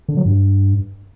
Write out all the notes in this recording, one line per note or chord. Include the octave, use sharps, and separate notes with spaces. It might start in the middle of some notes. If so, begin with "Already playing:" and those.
D3
F#3
G2